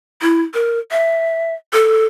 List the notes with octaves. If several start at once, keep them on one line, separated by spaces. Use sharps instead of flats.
E4
A#4
E5
A4